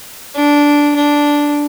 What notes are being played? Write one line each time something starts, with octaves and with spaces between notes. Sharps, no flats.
D4
D4